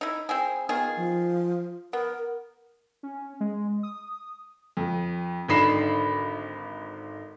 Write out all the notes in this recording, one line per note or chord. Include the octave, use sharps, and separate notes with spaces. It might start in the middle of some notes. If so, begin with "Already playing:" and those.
D#4 E4
C4 E4 G#4
D#3 B3 F4 G#4
F3
B3 A#4
C#4
G#3
D#6
F2
G#1 D3 D#4 B5 C7 E7